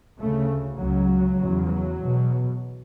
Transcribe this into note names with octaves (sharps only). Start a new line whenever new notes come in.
D2 C#3 A3
C#2 C#3 F#3
E2 C#3
F#3
E2 B2